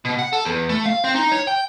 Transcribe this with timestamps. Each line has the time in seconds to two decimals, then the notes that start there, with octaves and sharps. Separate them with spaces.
0.05 B2
0.19 F#5
0.33 A4
0.45 E2
0.69 A3
0.86 F5
1.04 C4
1.15 D#4
1.32 C#5
1.47 G5